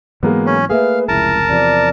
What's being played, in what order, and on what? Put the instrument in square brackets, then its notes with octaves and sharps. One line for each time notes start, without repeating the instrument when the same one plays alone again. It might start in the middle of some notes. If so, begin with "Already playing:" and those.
[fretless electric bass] G#2 E3 F#3 [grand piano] G#3 A#3 B3
[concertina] C#4
[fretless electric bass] A3 A#3 [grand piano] G#4 E5 [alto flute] B4 [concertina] F5
[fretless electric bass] F1 C#2 [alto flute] E4 [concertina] A#4 A5
[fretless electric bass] E2 C3 F3 [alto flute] D5